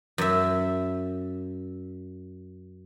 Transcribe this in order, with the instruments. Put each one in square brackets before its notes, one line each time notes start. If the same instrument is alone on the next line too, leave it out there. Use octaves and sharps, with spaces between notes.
[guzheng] F#2 E5